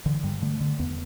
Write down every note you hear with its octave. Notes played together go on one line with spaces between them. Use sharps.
D3 E3
G2 G3
D3 A3
D3
E2 B3